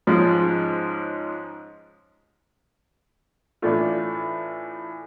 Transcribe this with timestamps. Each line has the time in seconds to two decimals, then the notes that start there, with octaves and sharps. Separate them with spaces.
0.07 G#2 F3 G#3 C#4 F4
3.62 A2 E3 A3 D4 F4